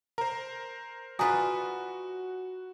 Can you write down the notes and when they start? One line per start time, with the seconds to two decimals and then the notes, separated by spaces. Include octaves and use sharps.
0.18 A#4 C5 A#5
1.19 F4 F#4 B4 D5 G#5 A#5 D#6